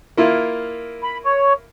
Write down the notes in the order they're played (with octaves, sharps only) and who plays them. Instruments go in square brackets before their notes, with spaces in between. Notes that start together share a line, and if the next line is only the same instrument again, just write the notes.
[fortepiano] A#3 E4 F4
[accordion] B5
C#5